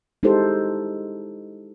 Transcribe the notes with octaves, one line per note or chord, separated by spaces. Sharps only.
G#3 D#4 E4 G4 A4 C5